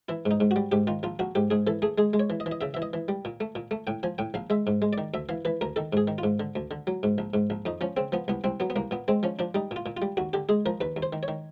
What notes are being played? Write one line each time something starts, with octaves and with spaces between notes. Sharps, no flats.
E3 E4
G#2
D#4
G#2
F#4
G3
G#2 G4
D#3 F4
A#1 F4
A#1 F#4
G#2 G4
G#2 G#4
E3 A4
A3 G#4
G#3 G#4
G#3
C#5
E3
D#5
E3
D#5
C#3 E5
E3 E5
D#5
E3
G3
A#2
A3
A#2
A3
A2 G5
F3 G#5
A2 G5
A#1 F5
G#3 E5
G#2
G#3
D5
D#3
D2 E5
E3 F5
E3 B4
D2 A#4
D#3 A4
G#2 G#4
D#3
F4
G#2
D3
D2
D3
F#3
G#2
A#1
G#2
A#1
F2 D#4
F3 C#4
C#3 C4
F3 B3
C2 B3
C2 C4
F#3 B3
B3
C2 A#3
A#2 B3
G#3 C4
F3 C#4
F3 D4
G3 D#4
A#2 F4
A#2
F4
G3
D#2 F#4
D3 G4
G#3 G#4
F3 A#4
D#2 B4
D#2
C5
D#3
C#5
D#3